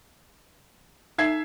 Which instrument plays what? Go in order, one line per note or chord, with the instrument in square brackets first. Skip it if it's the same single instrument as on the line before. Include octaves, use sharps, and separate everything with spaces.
[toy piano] D#4 A4 A#5 [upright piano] E5 G#6 C7